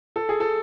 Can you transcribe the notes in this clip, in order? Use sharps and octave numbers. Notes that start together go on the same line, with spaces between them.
A4
G#4
A4